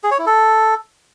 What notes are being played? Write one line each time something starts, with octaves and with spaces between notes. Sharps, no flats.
G#4
C#5
E4
A4